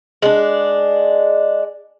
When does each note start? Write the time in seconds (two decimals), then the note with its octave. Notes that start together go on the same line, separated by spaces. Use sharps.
0.22 G#3 D4